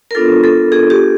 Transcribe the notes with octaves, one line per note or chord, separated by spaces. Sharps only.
A#4
B3 D4 F4 A4
A4
G#4
G4